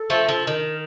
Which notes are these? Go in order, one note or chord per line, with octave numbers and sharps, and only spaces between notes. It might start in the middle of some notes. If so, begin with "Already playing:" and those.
Already playing: A4
F3 A3
F3
D#3 A#4